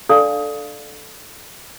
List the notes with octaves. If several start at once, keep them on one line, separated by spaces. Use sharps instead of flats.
D4 A4 D5 F5 A5 D#6